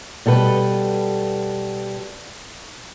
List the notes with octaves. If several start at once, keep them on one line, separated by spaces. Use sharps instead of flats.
B2 G3 A4 B4